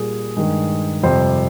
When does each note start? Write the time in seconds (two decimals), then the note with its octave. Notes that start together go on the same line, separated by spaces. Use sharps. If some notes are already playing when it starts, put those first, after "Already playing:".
Already playing: A#2 G3 A#3 G#4
0.37 G2 D#3 G#3
1.03 F2 C3 G3 C5